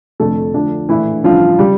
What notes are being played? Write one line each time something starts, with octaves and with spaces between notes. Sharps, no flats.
F1 F2 D3 A3 A4
D2 D3 F3 A3 D4
A#1 A2 E3 E4
A1 G2 D3 F3 F4
C#3 G3 G4